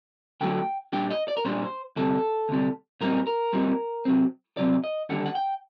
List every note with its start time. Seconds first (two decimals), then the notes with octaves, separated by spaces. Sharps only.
0.41 D2 D3 F#3 A3 G5
0.93 A#2 G3 D4 G5
1.10 D#5
1.28 D5
1.37 A#4
1.45 A#2 G3 D4 C5
1.96 D2 C3 G3 A4
2.49 D2 C3 G3
3.01 A#2 G3 C4 D#4 A#4
3.27 A#4
3.53 A#2 G3 C4 D#4
4.05 C3 F#3 C4
4.57 C3 F#3 C4 D5
4.84 D#5
5.09 D#2 D3 G3 D4 F#5
5.26 F#5
5.35 G5